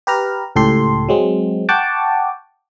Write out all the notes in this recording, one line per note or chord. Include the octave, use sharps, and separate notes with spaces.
G4 B4 A#5 F6
C#2 A2 G4 A4 C6
F#3 G#3 C4
F#5 G5 A5 C#6 D6